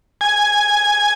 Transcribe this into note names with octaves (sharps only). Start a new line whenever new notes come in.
G#5